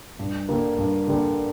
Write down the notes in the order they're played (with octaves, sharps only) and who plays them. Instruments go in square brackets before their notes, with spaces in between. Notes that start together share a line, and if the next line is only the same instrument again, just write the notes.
[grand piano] G2
D3 G3 A#3
G2
D3 G3 A#3